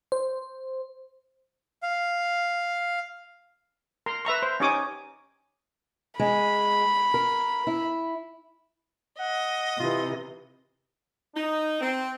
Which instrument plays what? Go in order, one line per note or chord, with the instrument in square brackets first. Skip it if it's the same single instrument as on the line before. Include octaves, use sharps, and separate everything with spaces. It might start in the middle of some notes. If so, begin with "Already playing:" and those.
[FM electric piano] C5
[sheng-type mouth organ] F5
[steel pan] A#4 A#5 C6
B4 E5 A#5 C#6
C5
C#4 D#4 G4 C#5 D6 D#6
[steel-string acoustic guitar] G#3 [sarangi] B5
[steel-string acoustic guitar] A#4
E4
[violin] D#5 [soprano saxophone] F#5
[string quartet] C3 E3 [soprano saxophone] F4
[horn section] D#4
C4